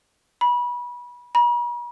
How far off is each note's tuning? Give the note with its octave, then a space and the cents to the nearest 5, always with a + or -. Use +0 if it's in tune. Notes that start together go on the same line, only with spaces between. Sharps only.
B5 -25
B5 -45